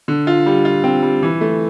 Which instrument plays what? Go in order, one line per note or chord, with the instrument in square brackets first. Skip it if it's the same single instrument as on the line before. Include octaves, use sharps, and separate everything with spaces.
[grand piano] D3
F4
G3
F4
C4
G3
E3
A3